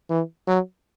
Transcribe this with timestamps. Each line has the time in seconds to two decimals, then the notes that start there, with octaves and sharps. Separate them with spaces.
0.10 E3
0.47 F#3